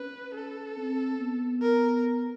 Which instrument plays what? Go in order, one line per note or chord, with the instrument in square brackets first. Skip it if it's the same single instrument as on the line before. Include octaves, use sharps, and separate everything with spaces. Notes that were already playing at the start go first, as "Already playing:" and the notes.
Already playing: [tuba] C#4 [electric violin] B4
[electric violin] A4
[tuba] C4
B3
[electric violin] A#4